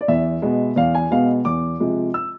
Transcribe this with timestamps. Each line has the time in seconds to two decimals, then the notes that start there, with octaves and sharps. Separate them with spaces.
0.01 D5
0.08 E2 E5
0.42 B2 G#3 B3
0.76 E2 F5
0.95 G#5
1.11 B2 G#3 B3 F5
1.45 E2 D6
1.80 C3 F3 G#3
2.14 E6